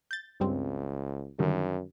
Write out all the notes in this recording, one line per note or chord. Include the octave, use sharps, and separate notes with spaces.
G6 A6
C#2 G2 G3 C4
F#2 D3 D#3 G3